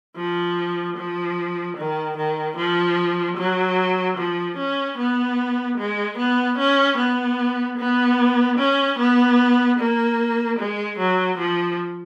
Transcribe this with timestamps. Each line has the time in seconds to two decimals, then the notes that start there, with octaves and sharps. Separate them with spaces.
0.16 F3
0.97 F3
1.77 D#3
2.17 D#3
2.57 F3
3.37 F#3
4.17 F3
4.57 C#4
4.97 B3
5.78 G#3
6.18 B3
6.58 C#4
6.98 B3
7.78 B3
8.58 C#4
8.98 B3
9.79 A#3
10.59 G#3
10.98 F#3
11.38 F3